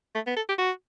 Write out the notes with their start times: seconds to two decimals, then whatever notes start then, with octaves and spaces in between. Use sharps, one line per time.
0.15 A3
0.27 B3
0.36 A4
0.48 G4
0.58 F#4